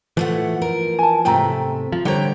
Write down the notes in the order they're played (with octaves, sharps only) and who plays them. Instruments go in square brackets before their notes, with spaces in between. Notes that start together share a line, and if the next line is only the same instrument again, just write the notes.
[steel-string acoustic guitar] A2 A3 F#5 [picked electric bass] E3 F3
[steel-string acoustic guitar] A#4
[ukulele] G#5 A5
[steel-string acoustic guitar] G#2 C3 A3 [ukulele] G5 A#5
[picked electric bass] F3
[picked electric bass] D3 G3 [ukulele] C5 C#5 F#5 [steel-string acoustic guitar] G5 A#5